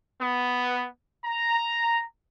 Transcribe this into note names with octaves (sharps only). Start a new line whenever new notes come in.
B3
A#5